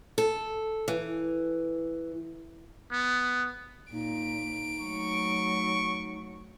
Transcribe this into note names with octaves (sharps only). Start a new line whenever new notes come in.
A4
E3
B3
A#2 D#4 D7
F#3 A3 C#6